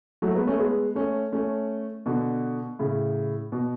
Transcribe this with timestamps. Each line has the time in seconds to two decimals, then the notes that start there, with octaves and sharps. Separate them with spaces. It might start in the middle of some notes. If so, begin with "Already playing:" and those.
0.22 F#3 A3
0.34 G#3 B3
0.47 A3 C#4
0.59 G#3 B3
0.95 A3 C#4
1.33 A3 C#4
2.06 B2 D3
2.79 A2 C#3
3.52 B2